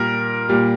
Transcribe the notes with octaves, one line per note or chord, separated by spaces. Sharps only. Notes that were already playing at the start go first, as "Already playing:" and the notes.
Already playing: A#2 G3 A#4
A#2 G3